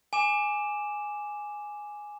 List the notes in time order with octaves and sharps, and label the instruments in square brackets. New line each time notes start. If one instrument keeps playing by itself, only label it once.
[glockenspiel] G#5 D6 E7